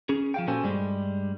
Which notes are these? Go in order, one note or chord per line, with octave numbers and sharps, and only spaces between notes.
C#4 G#4
F3 F5 G5
A#2 C#4 F#4 A4 C5 G#5
G2 G3 G#3